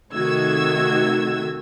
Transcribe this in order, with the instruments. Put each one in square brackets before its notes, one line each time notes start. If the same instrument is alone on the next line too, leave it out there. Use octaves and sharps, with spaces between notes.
[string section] C3 D#3 A3 F#4 E6 G#6